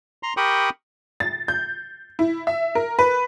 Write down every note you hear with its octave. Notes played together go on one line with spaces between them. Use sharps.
A#5 C6
G4 A#4 G5 B5 C#6 D#6
A6
G6
E4
E5
A#4
B4